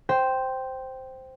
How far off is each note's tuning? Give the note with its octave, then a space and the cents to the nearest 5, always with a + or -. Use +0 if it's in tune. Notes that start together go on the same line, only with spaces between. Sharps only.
C5 +0 G5 -5